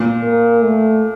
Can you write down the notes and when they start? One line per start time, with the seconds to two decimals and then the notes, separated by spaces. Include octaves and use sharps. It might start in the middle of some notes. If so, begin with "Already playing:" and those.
Already playing: A#2
0.23 A#3
0.62 A3